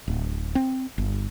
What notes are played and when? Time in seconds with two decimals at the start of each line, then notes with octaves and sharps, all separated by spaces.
0.08 D1
0.55 C4
0.98 G1